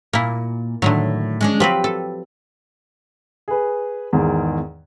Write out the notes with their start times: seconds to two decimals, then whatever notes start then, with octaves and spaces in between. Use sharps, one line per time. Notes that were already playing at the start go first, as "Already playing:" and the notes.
0.13 A#2 A#3 E4
0.82 A2 D3 D#3 F#3
1.41 G#3 C#4 D4
1.60 F3 F#3 C4 G4 B4
1.84 A4
3.48 G#4 B4
4.13 E2 G#2 D#3